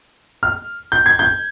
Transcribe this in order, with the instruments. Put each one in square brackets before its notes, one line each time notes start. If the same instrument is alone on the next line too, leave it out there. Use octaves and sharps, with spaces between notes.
[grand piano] F6
G6
G#6
G6